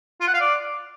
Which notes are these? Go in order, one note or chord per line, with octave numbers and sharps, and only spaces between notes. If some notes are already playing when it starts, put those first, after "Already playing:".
F4
F#5
F5
D5